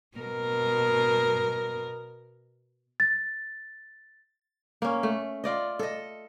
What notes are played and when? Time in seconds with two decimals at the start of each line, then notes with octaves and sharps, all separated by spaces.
0.17 B2 A#4
3.00 A6
4.82 A#3 C#4
5.03 A3
5.44 F4 D5 D#5
5.79 A4 D#5